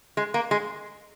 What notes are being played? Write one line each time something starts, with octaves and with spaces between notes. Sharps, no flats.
G#3
A#3
G#3